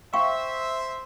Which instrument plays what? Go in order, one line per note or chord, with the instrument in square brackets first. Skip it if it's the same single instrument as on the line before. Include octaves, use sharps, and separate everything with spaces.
[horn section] C5 E5 [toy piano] F5 G5 C#6